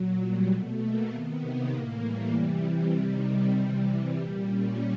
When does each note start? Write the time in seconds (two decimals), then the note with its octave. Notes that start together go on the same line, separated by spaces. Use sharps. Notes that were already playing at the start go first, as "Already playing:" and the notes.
Already playing: A#2 F#3
0.20 G3
0.50 B2 A3
0.81 A#3
1.11 C3 D#3 B3
1.41 A#3
1.71 A2 E3 A#3
2.02 G3
2.32 C3 E3
2.94 C3 D#3 G3
3.54 C3 E3
3.85 G3
4.15 A#2 G3
4.45 C#4